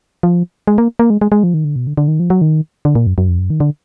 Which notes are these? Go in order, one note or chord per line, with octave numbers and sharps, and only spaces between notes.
F3
G#3
A#3
A#3
G#3
G#3
G#3
F3
D#3
D3
B2
D3
D3
D#3
F3
F#3
D#3
D3
A#2
F#2
F#2
F2
F#2
D#3
D3